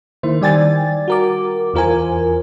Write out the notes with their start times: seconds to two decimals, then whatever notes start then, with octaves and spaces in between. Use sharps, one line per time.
0.23 D#3 A#3 E4 C5
0.41 D#3 G3 D5 G5 G#5 A6
1.08 F#4 A#4 D6
1.74 E2 E3 F4 A#4 C5 G#5